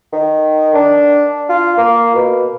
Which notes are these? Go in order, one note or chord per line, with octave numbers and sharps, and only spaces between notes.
D#3
D4
F4
A#3
B2